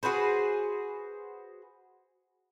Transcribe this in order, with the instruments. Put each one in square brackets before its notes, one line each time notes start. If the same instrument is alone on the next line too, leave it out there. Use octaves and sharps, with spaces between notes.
[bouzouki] F#4 G#4 B4 C5